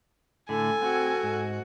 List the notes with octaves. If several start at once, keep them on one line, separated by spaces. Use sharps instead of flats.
A2 D3 A4 G#5
C4 F#4
G#2